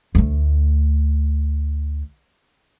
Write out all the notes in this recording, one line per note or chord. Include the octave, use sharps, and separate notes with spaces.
D2 A3